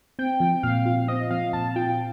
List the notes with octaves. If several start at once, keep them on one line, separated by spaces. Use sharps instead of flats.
C4 G5
F3
A#2 F5
F4
C4 D#5
F3 F5
A#2 A5
F4 G5